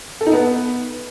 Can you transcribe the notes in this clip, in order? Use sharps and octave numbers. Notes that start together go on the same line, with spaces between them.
A4
D#4
B3